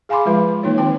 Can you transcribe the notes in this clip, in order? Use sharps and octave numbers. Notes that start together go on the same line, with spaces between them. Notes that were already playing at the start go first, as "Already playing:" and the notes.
G#4 F5 G#5 B5 C6 D6
F3 G#3 F4 B4 B5
E3 A#3 D#4 F4 C#5
D#3 C4 F4 G5